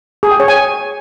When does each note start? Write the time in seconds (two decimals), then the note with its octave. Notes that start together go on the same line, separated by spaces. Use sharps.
0.23 G#4
0.31 G5
0.40 C#5
0.48 G#5